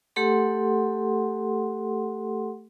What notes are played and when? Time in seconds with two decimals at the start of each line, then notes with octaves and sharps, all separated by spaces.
0.16 A3 G4 A4 F#5 C6